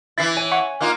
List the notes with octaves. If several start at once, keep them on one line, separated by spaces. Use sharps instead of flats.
E3 E4 A6 B6 C7
C#5 G#5
E5 F#5 C#6
A#3 D#4 F4 F#6